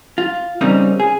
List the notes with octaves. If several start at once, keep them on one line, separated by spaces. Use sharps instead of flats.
F4
C#3 G3 A#3 C4 D#4
G#4